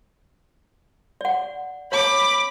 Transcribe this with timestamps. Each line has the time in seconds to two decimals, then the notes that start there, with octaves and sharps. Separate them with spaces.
1.21 D5 F#5
1.92 C#5 B5 D6